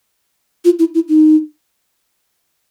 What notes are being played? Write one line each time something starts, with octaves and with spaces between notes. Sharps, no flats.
F4
E4
E4
D#4